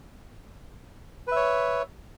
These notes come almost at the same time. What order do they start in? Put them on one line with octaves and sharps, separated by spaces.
B4 E5 C#5